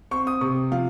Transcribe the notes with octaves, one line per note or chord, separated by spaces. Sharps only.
C4 C#6
D#6
C3 C#6
F3 F5